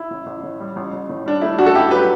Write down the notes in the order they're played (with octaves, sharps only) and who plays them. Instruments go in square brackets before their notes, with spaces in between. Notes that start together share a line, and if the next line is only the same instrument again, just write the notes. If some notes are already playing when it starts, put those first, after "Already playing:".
Already playing: [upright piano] E4
A1
A1
A2
G3
A1
A1
A2
G3 D4
A3 E4
A1 D4 F#4
A4
G2 E4 G4
F#3 G4 B4